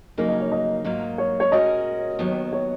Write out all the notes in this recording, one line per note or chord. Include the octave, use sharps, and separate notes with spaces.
F2 C#3 F#3 A#3 D#4 A#4
D#5
C#5
D#5
G#2 F#3 A#3 F4
C#5
C#5
A#2 G#3 C#4 F#4 A#4 D#5
D#2 D#3 F#3 B3
C#5